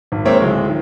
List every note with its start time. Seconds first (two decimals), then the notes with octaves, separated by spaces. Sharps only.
0.12 G#1
0.25 G#3 A#3 C4 C#5 E5
0.40 D1 G#3
0.68 D#3 F3